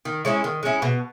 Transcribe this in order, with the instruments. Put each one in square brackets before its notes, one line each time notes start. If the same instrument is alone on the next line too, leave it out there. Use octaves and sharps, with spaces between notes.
[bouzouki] D#3
G#3 C#4 E4
D#3
G#3 C#4 E4
B2